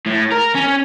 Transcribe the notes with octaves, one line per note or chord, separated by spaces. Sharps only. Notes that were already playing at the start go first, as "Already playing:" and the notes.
A2
A#4
C#4